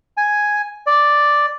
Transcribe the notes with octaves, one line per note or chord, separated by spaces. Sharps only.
G#5
D5